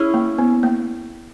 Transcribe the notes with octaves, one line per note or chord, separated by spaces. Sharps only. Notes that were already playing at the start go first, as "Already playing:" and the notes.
Already playing: C#4 E4 G#4 C#5
A#3
B3
A#3